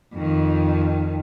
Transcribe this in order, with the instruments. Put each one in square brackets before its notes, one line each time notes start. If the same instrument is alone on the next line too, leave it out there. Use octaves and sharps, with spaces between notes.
[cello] F2 D#3